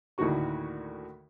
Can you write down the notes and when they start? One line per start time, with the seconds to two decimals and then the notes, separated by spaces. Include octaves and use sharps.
0.18 D2 A2 D#3 A#3 F#4 C#6